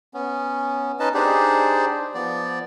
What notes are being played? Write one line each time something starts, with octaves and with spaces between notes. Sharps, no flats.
B3 C#4
C#4 D#4 B4 D#5 A5
D4 D#4 G4 G#4 C5 D5
F3 B3 D5